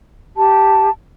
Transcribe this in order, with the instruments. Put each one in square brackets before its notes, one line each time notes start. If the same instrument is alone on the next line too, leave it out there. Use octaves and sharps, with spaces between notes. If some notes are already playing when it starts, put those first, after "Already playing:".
[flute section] G4 A5